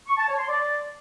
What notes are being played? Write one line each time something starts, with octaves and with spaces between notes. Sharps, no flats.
C#6
A5
C#5
C6
D5